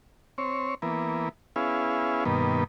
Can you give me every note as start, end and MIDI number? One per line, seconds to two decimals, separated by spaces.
0.38 0.75 60
0.38 0.75 73
0.82 1.29 52
0.82 1.29 58
0.82 1.29 59
1.56 2.24 59
1.56 2.24 61
1.56 2.24 64
1.56 2.24 68
1.56 2.24 77
2.25 2.64 43
2.25 2.64 47
2.25 2.64 51
2.25 2.64 58
2.25 2.64 59